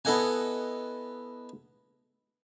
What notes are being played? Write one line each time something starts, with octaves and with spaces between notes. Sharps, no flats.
B3 E4 A4 D#5 F#5 G#5